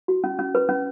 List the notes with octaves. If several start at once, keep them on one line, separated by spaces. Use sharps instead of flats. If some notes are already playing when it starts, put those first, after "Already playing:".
F#4
C#4
C#4
B4
C#4